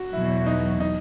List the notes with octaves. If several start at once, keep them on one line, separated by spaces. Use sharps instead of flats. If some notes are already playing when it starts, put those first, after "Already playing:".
Already playing: F#4
E2 B2 F#3 E4
D#4
D#4